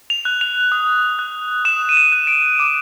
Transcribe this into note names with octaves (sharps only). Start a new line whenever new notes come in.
F7
F#6
F7
D#6
F#6
D#6 E7
D#7
E7
F#6
D7
D6